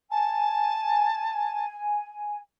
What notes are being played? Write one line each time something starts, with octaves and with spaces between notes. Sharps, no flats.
G#5 A5